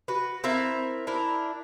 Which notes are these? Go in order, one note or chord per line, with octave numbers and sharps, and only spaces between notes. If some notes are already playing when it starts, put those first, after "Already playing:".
F#4 B4
C4 E4 A#4 E5
D4 E4 A#4